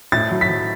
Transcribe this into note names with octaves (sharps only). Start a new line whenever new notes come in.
A2 A6
F#3
B6
F#3